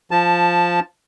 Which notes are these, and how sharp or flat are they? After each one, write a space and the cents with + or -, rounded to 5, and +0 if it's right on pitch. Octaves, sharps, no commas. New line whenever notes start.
F3 +0 A5 +0